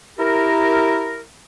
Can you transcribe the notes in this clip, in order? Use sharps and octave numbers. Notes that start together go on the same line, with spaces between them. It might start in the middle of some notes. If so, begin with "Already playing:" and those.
E4 G4 A#4